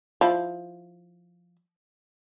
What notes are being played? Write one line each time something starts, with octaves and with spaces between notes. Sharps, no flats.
F3 E4